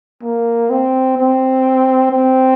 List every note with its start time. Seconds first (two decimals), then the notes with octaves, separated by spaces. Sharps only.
0.23 A#3
0.70 C4
1.17 C4
2.11 C4